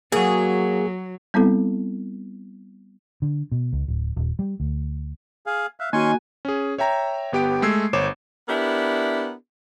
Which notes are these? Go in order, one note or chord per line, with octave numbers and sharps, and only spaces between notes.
F#3 A#3 F#4 G#4
G3 B3 C4 E4 A4
D3
B2
C#2
D1
D#1
G3
D2
G#4 F5
E5 F5 F#6
D#3 A#3 C#4 D#4 F#4 G#5 C6 C#6
C#4 G#4
C#5 E5 G5 A#5
G1 B3 G4 G5 D7
G#3 A3 E6 G#6 C7
G1 C5 C#5 D6 E7
B3 D4 E4 G4 A#4